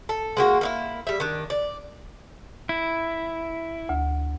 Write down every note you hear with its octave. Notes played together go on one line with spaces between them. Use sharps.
A4
G#3 A#3 F#4
A#3 D#4 E4
G3 E5
D#3 D4
D5
E4
D2